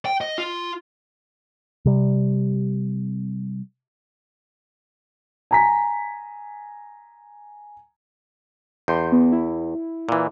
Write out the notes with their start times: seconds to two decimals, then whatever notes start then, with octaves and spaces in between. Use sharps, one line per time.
0.06 G5
0.21 D#5
0.38 F4
1.86 C3 G3
5.51 G#5 A#5 B6
8.88 E2 C6 G6
9.12 B3
9.32 E4
10.09 A#2 E3